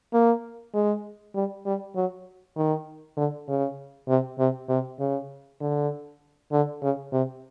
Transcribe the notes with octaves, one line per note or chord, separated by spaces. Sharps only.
A#3
G#3
G3
G3
F#3
D#3
D3
C#3
C3
C3
C3
C#3
D3
D3
C#3
C3